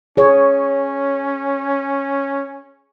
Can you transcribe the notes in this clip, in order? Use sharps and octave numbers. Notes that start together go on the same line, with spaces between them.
C#4 G#4 C#5